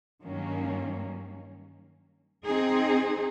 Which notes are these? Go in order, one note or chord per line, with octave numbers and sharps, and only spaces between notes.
G2 D#3 F#3 A#3 C#4
C4 D#4 G#4